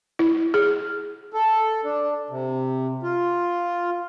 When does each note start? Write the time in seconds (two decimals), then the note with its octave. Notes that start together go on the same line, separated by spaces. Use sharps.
0.19 E4
0.54 G#4
1.33 A4
1.84 D4
2.30 C3
3.03 F4